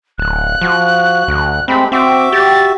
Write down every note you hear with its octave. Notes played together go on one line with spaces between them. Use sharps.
D1 F#6
F3 F#4
D2
G#3 A3 C4 G4 B5
C4 F#4 E5 D6
G4 A6